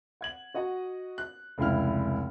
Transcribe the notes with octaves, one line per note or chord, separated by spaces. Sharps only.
F#5 G#6 F#7
F#4 D#5 F#5
F#6
F1 C#2 E4 F6